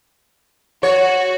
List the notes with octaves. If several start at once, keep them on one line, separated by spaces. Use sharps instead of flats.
F#4 C#5